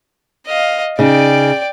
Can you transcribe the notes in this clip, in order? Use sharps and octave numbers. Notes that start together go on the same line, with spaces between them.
D#5 F5
C#3 D#4 D5 G5